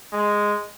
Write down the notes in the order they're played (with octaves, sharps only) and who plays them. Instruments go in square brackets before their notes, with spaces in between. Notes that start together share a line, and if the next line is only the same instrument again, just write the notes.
[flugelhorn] G#3